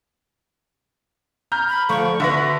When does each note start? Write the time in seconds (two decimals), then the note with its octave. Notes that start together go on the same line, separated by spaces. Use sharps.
1.52 A#5 F6 G6
1.68 B5
1.89 D3 F3 A3 C#6
2.20 D3 F#4 B4 E5 A#6